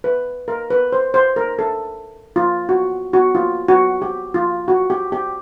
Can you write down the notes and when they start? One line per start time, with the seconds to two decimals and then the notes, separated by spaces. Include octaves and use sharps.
0.04 B4
0.48 A#4
0.70 B4
0.93 C5
1.14 C5
1.36 A#4
1.59 A4
2.36 F4
2.69 F#4
3.13 F#4
3.35 F4
3.68 F#4
4.02 G4
4.34 F4
4.68 F#4
4.90 G4
5.12 G4